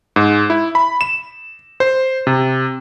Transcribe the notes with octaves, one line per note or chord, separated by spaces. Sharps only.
G#2
E4
B5
E7
C5
C3